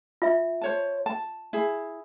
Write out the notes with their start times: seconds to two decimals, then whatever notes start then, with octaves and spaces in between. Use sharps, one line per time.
0.22 F4 E5
0.61 C5 C#5 A5
1.06 A5
1.53 E4 G#4